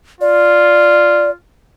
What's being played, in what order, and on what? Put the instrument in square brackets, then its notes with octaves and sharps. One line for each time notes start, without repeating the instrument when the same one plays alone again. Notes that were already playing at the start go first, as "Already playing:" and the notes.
[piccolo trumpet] F4 [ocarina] D5